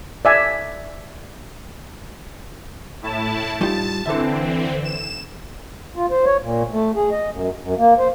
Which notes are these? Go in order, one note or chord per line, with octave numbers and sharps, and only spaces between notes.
D5 E5 G#5
A2 E4 A5
G3 D#4 F4 A5
D3 E3 C4 A4 E5
E7
F4
C5
C#5
A#2
A3
G#4
D#5
F#2
F#2
A#3
C5